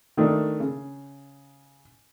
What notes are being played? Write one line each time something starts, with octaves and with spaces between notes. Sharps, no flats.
D#3 A3 D4
C#3